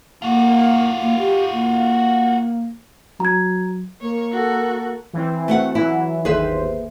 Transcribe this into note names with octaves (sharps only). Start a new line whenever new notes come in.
A#3 F4 F#4
A#3
G4
A#3
F#3 A#5 G#6
A#3 C#5
F#4 A4
E3 C4
A3 F#4 F#5
E3 F#3 E4
G1 D#2 G#4 B4 C5 E5